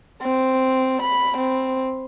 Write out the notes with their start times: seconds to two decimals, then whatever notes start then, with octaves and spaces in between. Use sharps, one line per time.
0.22 C4
1.02 B5
1.37 C4